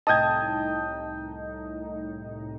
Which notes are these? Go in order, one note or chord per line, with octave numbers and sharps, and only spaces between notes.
C2 A2 D#4 D#5 G5 A5 D#6 G#6